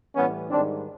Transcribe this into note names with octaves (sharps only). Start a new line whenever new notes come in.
A2 E3 G3 B3 C#4
G#2 D#3 G3 C4 D4